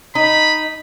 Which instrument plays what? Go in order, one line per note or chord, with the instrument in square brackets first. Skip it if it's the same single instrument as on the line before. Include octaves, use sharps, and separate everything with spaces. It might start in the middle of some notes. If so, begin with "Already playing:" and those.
[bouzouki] D#4 [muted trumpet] B5